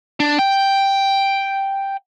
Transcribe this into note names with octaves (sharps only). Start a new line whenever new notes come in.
D4
G5